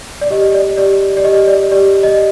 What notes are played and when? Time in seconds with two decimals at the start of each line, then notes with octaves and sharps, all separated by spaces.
0.21 D5
0.30 G4 D#5
0.55 D5
0.77 G4 D5
1.01 D5
1.17 D5
1.24 G4 D#5
1.48 D5
1.71 G4 D5
1.95 D5
2.03 D#5